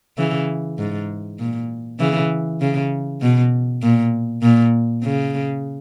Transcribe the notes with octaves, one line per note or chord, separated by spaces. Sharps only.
C#3 E3
G#2
A#2
C#3 E3
C#3
B2
A#2
A#2
C#3